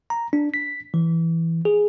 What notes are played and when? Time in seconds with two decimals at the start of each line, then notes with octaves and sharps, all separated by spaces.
0.10 A#5
0.33 D4
0.54 B6
0.94 E3
1.65 G#4